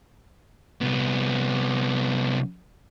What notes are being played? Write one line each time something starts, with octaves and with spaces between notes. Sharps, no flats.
C2 B3